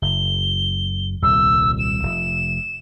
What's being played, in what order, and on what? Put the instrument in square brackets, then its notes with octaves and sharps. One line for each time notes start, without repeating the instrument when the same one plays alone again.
[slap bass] F#1 [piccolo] G7
[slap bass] D#1 C2 [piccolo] E6
[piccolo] E7
[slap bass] F1